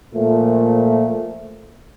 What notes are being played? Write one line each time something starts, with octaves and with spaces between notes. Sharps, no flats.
A#2 F3 A3